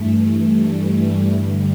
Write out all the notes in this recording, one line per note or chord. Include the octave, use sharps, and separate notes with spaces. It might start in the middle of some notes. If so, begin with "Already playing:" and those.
Already playing: G2 E3 A3
G3
G2 D3 G3